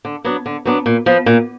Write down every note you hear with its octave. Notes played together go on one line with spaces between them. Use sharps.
D3
F#3 B3 D4
D3
F#3 B3 D4
A#2
F3 B3
A#2